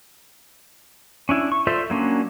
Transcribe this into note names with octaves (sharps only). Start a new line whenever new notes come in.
C#4 D4 E4
C#6
F4 A4 C5 D5 E5
F#3 A#3 C#4 D4